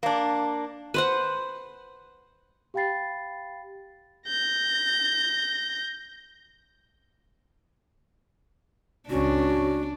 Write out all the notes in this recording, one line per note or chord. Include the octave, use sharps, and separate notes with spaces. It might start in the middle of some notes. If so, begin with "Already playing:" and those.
A#3 D4
B4 C5 F#5
G4 F5 G5 B5 A6 C7
G6 A#6
C#2 C#4 D4 F#4